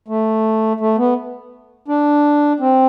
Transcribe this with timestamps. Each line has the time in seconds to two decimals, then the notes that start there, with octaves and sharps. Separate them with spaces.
0.08 A3
0.80 A3
0.98 B3
1.88 D4
2.60 C4